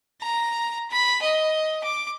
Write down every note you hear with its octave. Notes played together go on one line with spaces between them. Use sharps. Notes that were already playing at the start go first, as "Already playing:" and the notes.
A#5
B5
D#5
D6